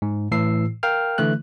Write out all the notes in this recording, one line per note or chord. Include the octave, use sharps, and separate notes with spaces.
G#2
A2 E3 E6 C7
A#4 F5 G5 F6
D3 E3 A3 F#6